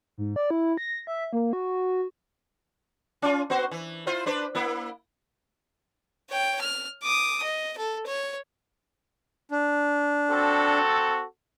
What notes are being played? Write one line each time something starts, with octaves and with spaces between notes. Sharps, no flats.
G#2
D5
E4
A#6
E5
A#3
F#4
C#4 F4
B3 F#4 C5
E3
E4 F4 C5
D4 B4 C5
A#3 E4
C#5 G5
F6
D6 D#6
D#5
A4
C#5
D4
C4 F#4 A4